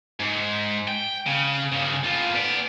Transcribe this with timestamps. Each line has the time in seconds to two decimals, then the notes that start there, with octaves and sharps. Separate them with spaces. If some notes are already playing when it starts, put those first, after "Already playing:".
0.20 G#2
0.88 G5
1.26 C#3
1.72 G2 C#3
2.03 A2 F4
2.34 B3 D5